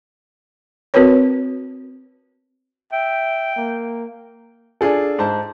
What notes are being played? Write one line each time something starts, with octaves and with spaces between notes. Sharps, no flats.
C4 F#4 A#4 B4 C#5
E5 G5
A#3
D4 F4 G#4 A4
G#2 C5 A5